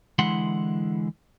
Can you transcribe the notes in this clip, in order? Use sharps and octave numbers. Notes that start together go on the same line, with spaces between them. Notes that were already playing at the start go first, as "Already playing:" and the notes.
D3 E3 G#3 E4 F#5 C6